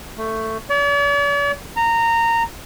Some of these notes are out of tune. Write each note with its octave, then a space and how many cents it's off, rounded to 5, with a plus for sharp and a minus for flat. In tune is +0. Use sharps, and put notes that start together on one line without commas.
A3 +10
D5 -45
A#5 -15